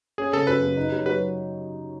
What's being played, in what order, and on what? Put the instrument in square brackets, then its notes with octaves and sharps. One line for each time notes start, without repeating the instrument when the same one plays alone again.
[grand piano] C#4 [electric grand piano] G#4
[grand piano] C#3 [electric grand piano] A4
[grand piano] F#2 [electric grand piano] B4
[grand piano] C#3
D#4
F#3
[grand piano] F#3 [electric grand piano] B4